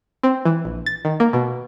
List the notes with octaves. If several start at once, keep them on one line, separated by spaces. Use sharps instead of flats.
C4
E3
A#1
A6
D#3
A#3
B2